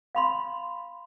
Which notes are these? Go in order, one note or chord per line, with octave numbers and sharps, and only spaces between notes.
F5 B5 C6